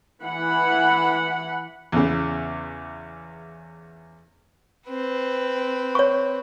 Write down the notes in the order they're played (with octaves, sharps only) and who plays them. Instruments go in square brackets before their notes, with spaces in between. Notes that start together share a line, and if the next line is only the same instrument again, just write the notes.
[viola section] E3 F#5 B5
[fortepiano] E2 C#3
[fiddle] C4 B4
[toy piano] C#5 C#6